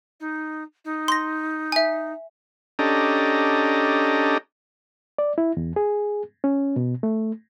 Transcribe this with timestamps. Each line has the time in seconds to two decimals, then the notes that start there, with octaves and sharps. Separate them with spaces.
0.20 D#4
0.84 D#4
1.08 C6 A#6
1.72 E5 G#5
2.79 C#4 D4 G4 A4 D#5 A#5
5.18 D5
5.38 E4
5.57 E2
5.76 G#4
6.44 C#4
6.76 B2
7.03 A3